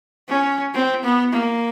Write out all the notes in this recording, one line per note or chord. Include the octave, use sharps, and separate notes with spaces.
C#4
C4
B3
A#3